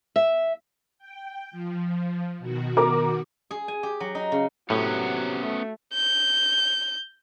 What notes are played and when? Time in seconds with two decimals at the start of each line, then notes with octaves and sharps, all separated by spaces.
0.16 E5
0.98 G5
1.51 F3
2.38 B2 D#3 F#4
2.77 A#4 D6
3.51 G#4
3.68 G#5
3.83 G4
4.00 F#3
4.15 D#4
4.32 C#3
4.70 A2 C3 F#3 B3 C#4
5.42 A3
5.94 G6